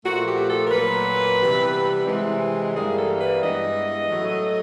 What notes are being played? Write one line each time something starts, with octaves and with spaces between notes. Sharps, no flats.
A#2 F3 A3 F#4
G4
A4
A#4
A#2 F#3 A#3 B4
C3 E3 G3 B3
C3 E3 G#3
G2 E3 G3 A#3 G#4
A4
B4
G2 E3 G#3 B3 D#5
A2 F#3 A3